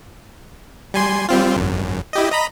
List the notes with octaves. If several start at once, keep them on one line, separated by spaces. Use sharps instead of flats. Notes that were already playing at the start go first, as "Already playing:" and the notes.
G3 G#5 C6
G3 C4 F4
G#1 F#2
E4 G4 D#5
D#5 A#5 B5